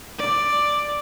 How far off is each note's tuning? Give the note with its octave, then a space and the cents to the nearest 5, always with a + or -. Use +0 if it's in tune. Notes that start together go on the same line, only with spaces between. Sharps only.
D5 +5